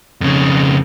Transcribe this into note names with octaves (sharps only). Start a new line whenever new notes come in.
F2 C#3